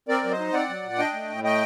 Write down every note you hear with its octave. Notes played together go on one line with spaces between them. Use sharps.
C4 A#4 D5
F#3
C5 D#5
D#4
C4 D5 F#5
F#3
A#2
D4 D#5 G5
A3
A2
A3 D#5 G5